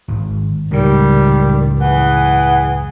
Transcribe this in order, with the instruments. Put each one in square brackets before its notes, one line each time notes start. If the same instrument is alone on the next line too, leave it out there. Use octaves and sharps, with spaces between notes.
[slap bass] G#1
[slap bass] C#2 F#2 A2 [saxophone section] D#3 G3
[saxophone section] E3 G#4 F#5